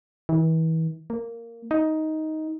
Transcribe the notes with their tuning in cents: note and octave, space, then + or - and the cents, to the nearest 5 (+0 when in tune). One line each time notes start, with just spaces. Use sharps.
E3 -35
A#3 -10
D#4 +10